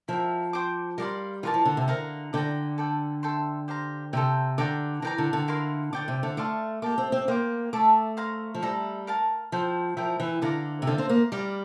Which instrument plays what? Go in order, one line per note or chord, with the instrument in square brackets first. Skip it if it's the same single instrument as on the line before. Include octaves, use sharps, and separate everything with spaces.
[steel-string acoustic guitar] F3 [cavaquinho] E4 A#4 E5 G5
[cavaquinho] C5 G5 D6
[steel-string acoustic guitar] G3 [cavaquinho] A#4 D5 F5 C6
[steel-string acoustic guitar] E3 [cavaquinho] F4 A#4 D5 A5
[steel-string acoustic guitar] F3
D3
C3
[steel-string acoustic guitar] D3 [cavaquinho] A#4 F5 A#5
[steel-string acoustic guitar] D3 [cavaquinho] D5 G5 A#5
[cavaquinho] A4 D5 G5
A4 E5 G5 C6
G4 C5 F5 A#5
[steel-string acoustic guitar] C3 [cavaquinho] A4 C5 G5
[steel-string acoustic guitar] D3 [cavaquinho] D5 G5 A#5 D6
[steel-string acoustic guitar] E3 [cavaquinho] A#4 D5 G5 A#5
[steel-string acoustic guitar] D3
D3
[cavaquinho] E4 A#4 F5 C6
[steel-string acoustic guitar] D3 [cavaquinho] D5 G5 D6
[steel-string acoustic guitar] C3
D3
[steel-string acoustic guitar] A3 [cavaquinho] D5 F5 A5 C6
[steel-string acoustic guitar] A#3 [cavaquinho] G4 D5 A5 D6
[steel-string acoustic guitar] C4
C4
[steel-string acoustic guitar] A#3 [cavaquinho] C5 G5 D6
[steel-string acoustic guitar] A3 [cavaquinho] A4 E5 A5 D6
[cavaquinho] C5 F5 A#5
[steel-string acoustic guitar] F3
[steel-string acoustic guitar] G3 [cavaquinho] A4 E5 A#5
[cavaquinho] A#4 F5 A5
[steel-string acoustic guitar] F3 [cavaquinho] A4 C5 G5
[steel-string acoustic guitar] F3 [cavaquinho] E4 A#4 E5 G5
[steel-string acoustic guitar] E3
[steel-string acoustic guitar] D3 [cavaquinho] D5 F5 A#5 D6
[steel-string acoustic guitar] C3
[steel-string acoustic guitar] D3 [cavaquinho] F4 C5 F5
[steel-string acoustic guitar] C4
A#3
[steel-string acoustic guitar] G3 [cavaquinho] D5 F5 A#5 D6